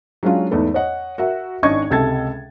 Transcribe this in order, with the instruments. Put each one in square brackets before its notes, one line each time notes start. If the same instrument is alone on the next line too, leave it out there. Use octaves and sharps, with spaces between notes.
[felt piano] F#3 G#3 C#4 D4 F4
E2 G#2 A3 B3
C#5 D#5 F#5
F#4 A#4 E5 F#5
G#1 C#4 D4 D#5 C#6 G#6
C#2 C3 A4 G#6 A6